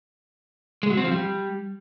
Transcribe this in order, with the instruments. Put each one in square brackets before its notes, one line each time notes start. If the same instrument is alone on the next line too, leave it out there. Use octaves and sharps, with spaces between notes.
[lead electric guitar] G#3
F#3
C4
F3
G3